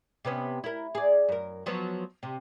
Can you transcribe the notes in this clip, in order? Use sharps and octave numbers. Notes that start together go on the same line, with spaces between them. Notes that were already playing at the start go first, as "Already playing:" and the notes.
C3 B3 C#4
E4 A#4
G#4 D5
F#2 A#4
F3 F#3 B3
C3